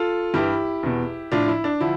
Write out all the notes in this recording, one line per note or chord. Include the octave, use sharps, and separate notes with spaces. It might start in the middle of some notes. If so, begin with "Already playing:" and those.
Already playing: F4 A4
G2 E3 E4 G4
E2 B2
A2 F3 D4 F4
E4
D4
D3 F3 E4